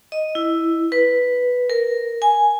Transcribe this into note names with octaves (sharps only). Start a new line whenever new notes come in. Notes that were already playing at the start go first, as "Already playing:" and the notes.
D#5
E4
B4
A#4
G#5